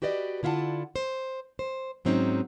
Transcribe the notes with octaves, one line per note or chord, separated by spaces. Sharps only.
F#4 G4 B4 D5 D#5
D3 E4 F4 E5 F#5 A5
C5
C5
G#2 F#3 C4 C#4 D#4